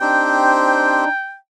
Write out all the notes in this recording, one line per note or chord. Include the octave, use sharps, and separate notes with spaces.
C4 D4 D#4 G4 C5 G5